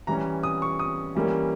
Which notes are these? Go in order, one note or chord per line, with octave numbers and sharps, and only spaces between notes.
E3 G3 C#4 A#5
D#6
C#6
D#6
E3 G3 A#3 C#4